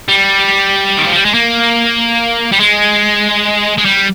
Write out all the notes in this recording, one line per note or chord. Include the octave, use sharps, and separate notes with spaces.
G3
D#3
F3
G3
G#3
A#3
G3
G#3
G#3
G3